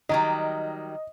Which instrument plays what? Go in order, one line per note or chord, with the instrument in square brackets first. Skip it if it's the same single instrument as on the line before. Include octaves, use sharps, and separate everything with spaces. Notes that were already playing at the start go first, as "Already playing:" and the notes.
[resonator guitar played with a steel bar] D#3 F#3 G3 [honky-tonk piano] D#5